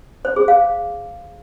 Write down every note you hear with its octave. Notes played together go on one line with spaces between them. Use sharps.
C5
G#4
F5